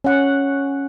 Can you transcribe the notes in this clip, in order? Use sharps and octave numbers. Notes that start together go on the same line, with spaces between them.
C#4 F#5